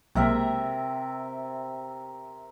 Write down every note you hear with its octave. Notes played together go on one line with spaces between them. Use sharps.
B1 C3 G#3 A#3 A#4 E5